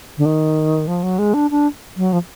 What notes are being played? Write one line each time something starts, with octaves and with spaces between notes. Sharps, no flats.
D3
D#3
F3
F#3
G#3
D4
D4
F#3
F3